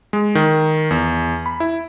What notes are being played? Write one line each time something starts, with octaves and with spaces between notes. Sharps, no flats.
G#3
D#3
E2
B5
E4